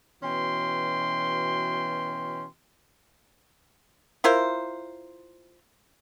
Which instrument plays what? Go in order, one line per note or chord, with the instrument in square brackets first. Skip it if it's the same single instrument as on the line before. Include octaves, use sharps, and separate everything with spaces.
[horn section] B2 E3 C#4 F#4 G5 C6
[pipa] E4 F4 A#4 C5